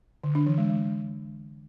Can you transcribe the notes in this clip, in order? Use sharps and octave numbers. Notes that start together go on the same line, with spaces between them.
D3
D4
E3
G#3
G#3